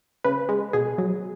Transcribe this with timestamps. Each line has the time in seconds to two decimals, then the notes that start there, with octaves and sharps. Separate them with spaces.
0.24 C#3 B4
0.49 G#3
0.73 B2 G#4
0.98 F#3